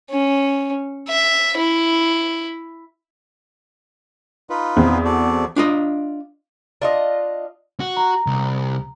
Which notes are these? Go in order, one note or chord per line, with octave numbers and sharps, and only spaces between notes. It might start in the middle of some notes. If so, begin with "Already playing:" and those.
C#4
E5
E4
D#4 F4 B4
E2 C4
F#4 A4 D5
D4 F4 D#5
D4 F4 D#5
F#4
A#5
C2